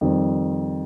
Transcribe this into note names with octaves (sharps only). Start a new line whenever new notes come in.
F2 D#3 G3 C4